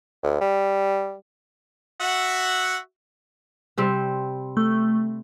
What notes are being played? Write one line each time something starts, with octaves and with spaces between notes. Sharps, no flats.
D2
G3
F#4 E5 F#5
C3 G3 C4
A3